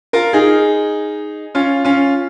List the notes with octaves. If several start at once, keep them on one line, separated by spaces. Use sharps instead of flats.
F4 A#4
D#4 G#4
C#4 F4
C#4 F4